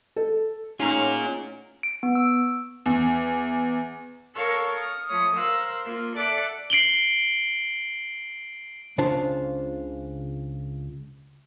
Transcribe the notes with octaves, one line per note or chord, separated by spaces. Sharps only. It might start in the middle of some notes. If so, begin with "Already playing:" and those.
A4
A3 C#4 D#4 F4 G#4 F#5 A#5
D7
B3
E6
E2
A4 A#4 C#5 F5 C#6 E6
D#6 F6
F3 A3 C#5 D#6
A#4 C5 F5 A#5 E6 F#6
A#3 F4
A4 D5 E5 F#5 D6 F#6
C7 D7 F#7 G7
C#2 C#3 D4 F4 C5 A5